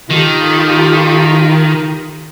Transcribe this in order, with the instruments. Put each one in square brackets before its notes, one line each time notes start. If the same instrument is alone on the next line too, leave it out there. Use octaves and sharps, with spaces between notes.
[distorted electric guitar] D#3 [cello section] F4 G4 A4